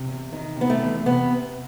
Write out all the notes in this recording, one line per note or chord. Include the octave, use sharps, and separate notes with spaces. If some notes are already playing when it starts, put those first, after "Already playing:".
Already playing: C3
E2
D#3
C3 B3
A3
E2
C3 B3